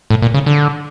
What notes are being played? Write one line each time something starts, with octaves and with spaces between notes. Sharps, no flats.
A2
A#2
C#3
D3